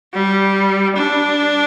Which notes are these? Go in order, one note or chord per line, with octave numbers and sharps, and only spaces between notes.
G3
D4